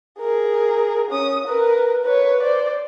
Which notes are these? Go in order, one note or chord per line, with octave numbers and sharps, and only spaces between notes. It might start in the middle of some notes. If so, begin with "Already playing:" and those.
G#4 A#4
C#4 D#6
A#4 B4
B4 C#5
C5 D5